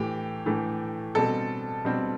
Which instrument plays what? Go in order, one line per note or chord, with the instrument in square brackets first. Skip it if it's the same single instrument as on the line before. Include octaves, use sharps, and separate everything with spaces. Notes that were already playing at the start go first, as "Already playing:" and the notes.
Already playing: [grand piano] A2 E3 A3 G4
A2 E3 A3
B2 G3 C4 A4
B2 G3 C4